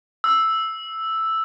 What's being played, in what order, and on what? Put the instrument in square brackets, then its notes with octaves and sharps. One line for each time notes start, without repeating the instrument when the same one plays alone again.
[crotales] E6